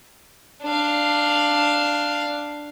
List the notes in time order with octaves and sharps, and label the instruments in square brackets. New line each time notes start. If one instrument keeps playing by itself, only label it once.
[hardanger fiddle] D4 F5